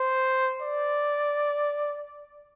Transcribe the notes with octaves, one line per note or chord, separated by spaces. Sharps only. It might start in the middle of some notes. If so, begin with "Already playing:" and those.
Already playing: C5
D5